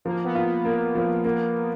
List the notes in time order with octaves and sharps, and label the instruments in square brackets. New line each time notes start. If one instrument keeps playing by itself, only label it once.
[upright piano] F3 [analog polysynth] A#3
[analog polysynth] B3
[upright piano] F4
[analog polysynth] B3
[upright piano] A#3 [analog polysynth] B3
[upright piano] F3
A#3